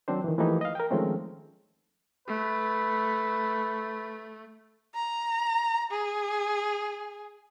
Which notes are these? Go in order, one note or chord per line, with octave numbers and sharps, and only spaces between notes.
D#3 F#3 C4 D4 C5
D#3 E3
E3 F3 A3 A#3 D#4 G4
D#5 F5
A#4 G5
D#3 F3 G#3 A3 C4 C#4
A3 B4
A#5
G#4